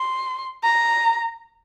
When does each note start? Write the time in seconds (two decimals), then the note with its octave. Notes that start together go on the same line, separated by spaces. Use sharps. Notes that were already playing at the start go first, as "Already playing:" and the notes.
Already playing: C6
0.64 A#5